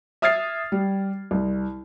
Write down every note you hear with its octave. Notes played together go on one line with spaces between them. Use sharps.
E5 D#6 F6 G#6 A6 C7
G3
C2